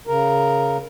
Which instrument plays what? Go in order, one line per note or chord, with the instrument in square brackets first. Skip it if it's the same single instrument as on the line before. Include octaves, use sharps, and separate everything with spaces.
[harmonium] C#3 A#4